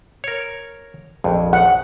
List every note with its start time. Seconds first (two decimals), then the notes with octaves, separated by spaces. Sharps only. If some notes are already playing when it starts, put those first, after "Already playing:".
0.24 A#4 C#5
1.24 A#1 F2
1.53 F#5